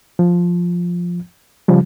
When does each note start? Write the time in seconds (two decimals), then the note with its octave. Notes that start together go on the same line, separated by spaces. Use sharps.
0.19 F3
1.68 C#3 F3 G3